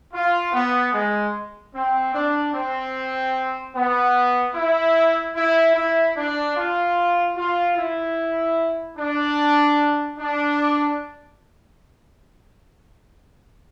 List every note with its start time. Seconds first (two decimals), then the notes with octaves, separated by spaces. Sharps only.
0.12 F4
0.53 B3
0.92 G#3
1.73 C4
2.14 D4
2.53 C4
3.74 B3
4.55 E4
5.35 E4
5.75 E4
6.15 D4
6.55 F4
7.36 F4
7.76 E4
8.96 D4
10.17 D4